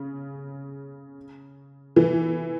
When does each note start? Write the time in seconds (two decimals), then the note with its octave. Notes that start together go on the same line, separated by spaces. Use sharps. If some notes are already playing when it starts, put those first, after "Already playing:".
Already playing: C#3
1.96 E3